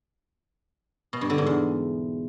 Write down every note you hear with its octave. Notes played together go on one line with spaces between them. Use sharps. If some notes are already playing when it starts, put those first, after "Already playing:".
B2
G2
D3
G#2
E2